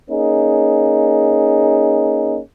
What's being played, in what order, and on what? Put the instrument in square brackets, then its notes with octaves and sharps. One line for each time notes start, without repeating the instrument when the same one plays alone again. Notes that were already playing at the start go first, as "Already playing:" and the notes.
[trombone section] A#3 C#4 D#4 G#4